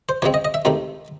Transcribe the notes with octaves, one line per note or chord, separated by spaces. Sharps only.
C5
C#2 C#3 G#3 C4 C#5
D#5
D#5
E5
C#2 C3 D#3 A3